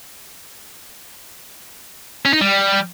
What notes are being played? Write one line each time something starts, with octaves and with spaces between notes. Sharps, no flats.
C#4
D#4
G3